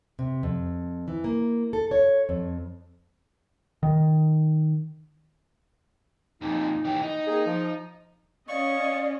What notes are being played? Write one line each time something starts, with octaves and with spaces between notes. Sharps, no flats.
C3
F2
E3
A#3
A4
C#5
F2
D#3
F2 A#2 D#4
E3 G4
D#4
A#3 C4 G#4
F3
C#4 D5 D#5 F5 C#6